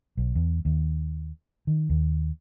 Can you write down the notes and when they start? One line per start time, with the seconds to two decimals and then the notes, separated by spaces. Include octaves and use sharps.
0.17 B1
0.35 E2
0.65 D#2
1.67 D#3
1.89 D#2